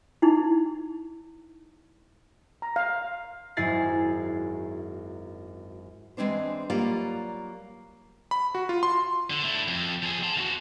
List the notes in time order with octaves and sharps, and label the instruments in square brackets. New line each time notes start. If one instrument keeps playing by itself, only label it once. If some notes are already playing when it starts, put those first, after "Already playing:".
[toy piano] D#4 E4
[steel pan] A#5
F5
[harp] G#1 F#2 E4 G#4 A6 C7
[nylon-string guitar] E3 G#3 C4 D4 C5
F#3 G3 A#3 F4 D5
[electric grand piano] B5
F#4
F4
C6
[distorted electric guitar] D3
A3 E4
F2
F3 G#4
A5 C6
E2 F#4